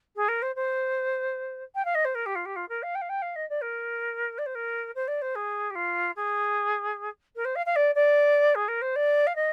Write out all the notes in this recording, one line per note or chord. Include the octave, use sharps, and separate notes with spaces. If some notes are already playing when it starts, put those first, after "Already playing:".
G#4
A#4
C5
C5
G5
F5
D#5
C5
A#4
G4
F4
G4
F4
A#4
F5
G5
F5
G5
F5
D#5
D5
A#4
D5
C5
A#4
C5
D5
C5
G#4
G4
F4
G#4
A#4
C5
F5
F5
D5
D5
G#4
A#4
C5
D5
F5
D#5